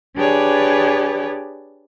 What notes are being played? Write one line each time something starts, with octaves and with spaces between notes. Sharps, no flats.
D4 G4 G#4 B4 C#5 D5